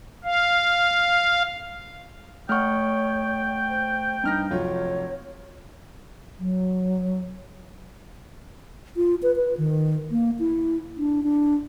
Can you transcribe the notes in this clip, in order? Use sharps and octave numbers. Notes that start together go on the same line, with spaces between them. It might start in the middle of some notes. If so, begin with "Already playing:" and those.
F5
A3 C#5 F#5 G5 C#6 F6
C5
G2 D#4 F6 A#6
F1 F#3 F4 C#5
F#3
F4
B4
B4
D#3
A#3
E4
D4
D4